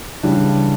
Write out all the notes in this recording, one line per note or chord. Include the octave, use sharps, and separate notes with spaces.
C#3 E3 G3 D4 G4